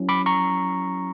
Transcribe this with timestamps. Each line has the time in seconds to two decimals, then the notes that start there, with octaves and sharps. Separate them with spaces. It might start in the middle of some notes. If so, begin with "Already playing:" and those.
Already playing: F#3 C#4 E4
0.09 B5 D6
0.26 A#5 C#6